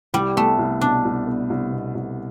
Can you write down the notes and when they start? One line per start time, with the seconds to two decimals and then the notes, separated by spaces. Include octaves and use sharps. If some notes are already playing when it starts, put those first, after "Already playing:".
0.14 C2 G3
0.36 A3 B3
0.59 C2
0.81 B2 D4
1.05 C2
1.27 B3
1.50 C2
1.72 B2
1.95 C2